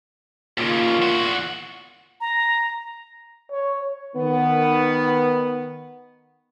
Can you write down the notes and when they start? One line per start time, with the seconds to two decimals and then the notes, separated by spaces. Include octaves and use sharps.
0.58 D#2 A#2 C#3 F4
1.02 E2 F#4
2.21 A#5
3.51 C#5
4.16 D#3 B3